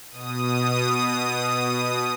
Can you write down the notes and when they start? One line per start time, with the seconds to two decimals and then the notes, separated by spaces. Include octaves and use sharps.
0.11 B2 D#6